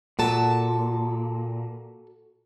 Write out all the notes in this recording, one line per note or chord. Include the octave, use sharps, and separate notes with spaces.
A#2 F#4 A4 A5